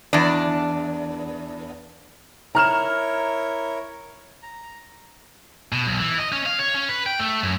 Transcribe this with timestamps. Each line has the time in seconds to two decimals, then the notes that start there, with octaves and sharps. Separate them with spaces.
0.13 E2 D4
2.55 E4 A#4 C#5 A#5 F6 E7
4.43 A#5
5.72 B2
5.87 B1
5.99 E3
6.18 D#5
6.32 C#4
6.46 F5
6.59 C#5
6.74 C#4
6.89 B4
7.06 G5
7.19 A3
7.43 F#2